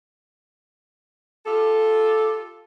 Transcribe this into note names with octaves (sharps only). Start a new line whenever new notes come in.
F4 G4 A4